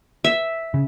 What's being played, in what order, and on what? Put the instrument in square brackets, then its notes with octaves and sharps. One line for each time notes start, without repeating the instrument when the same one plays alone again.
[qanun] E5
[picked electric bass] C#3